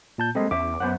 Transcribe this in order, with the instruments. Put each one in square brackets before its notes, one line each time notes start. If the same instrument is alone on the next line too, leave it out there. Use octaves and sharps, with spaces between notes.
[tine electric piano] A#2 A5 G6
[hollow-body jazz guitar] G3 G#3 A#3 [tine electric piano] C4 A4 D#5
[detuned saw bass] E2 [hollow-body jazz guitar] C#4 E5 [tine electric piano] D6
[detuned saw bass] F#2 [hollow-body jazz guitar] B3 C5 F#5